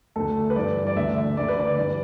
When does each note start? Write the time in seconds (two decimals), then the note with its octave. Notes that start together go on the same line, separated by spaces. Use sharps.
0.16 D2 D3 A4
0.50 B4
0.56 G2 E3 D5
0.87 D5
0.96 D2 D3 E5
1.37 D2 D3 D5
1.49 B4
1.59 D5
1.77 G2 E3 D5